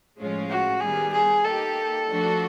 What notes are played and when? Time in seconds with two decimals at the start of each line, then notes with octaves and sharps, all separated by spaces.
0.19 A2 F3 G#3 C#4 F4
0.49 F#4
0.80 D#3 G3 B3 G#4
1.13 G#4
1.44 A#3 D#4 G4 A4
2.07 F3 A3 D4 F#4